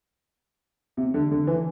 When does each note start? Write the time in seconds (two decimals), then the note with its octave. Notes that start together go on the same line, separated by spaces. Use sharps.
0.97 C3
1.14 D3
1.31 D3
1.47 E3